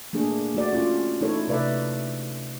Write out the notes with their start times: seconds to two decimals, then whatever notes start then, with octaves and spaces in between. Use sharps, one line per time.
0.13 A3 A#3 D4 G#4
0.55 A3 F#4 D5
0.73 C#4 F4
1.21 A3 D#4 E4 A4 C#5
1.48 C3 A3 B4 D5 E5